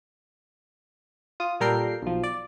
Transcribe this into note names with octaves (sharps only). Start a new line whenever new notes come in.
F4 D#6
A#2 G3 A4 A#4 G5 C7
B1 F3
D5